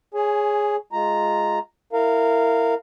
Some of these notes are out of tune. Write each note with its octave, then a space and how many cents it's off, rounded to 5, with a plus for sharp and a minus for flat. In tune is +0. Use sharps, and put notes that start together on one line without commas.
G#4 +0 C#5 +0 G#5 +20
G#3 +0 F4 +0 A#5 +0
E4 +0 A#4 -20 F5 -5